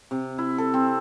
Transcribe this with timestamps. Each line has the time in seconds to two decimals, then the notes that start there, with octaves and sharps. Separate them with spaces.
0.11 C3
0.38 E4
0.58 A4
0.74 C4